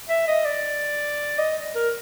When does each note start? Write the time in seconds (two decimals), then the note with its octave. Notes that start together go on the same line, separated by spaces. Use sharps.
0.09 E5
0.28 D#5
0.45 D5
1.38 D#5
1.75 A#4